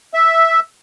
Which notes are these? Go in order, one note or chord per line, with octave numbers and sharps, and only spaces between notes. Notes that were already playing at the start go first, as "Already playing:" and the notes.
E5